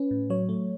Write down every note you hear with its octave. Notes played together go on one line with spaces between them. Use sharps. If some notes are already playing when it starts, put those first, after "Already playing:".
Already playing: C#4 B4
A2
F#3 C#5
A3